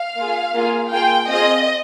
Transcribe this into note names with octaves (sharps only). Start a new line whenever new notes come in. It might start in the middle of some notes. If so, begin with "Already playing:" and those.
Already playing: F5
A#3 F4 G#4
A#3 F4 G#4
A#3 F4 G#4 G5
C4 F4 G#4 D#5